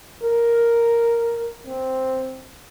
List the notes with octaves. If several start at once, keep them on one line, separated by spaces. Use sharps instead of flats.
A#4
C4